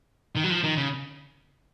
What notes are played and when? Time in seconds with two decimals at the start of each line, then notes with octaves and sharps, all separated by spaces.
0.36 D#3
0.44 F#3
0.50 F3
0.64 D#3
0.77 C#3